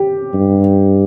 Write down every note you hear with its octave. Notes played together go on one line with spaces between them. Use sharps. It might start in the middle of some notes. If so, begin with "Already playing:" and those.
Already playing: G4
G2